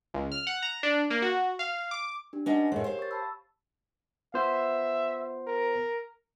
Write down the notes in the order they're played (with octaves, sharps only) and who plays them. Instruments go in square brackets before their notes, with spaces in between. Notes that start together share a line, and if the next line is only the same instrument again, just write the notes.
[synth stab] C#2
F6
F#5
A#5
D4
A#3
F#4
F5
D6
[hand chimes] D4 G4
[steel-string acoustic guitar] C#4 D4 D#5 [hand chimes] B4 F#5 G#5
[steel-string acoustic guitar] A2 G#3 [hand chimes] A#4 C#5
[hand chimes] G4 [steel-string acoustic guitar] C5 F5
[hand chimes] C#6 A6
A5 B5 E6
[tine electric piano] B3 F4 C5 [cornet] E5
[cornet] A#4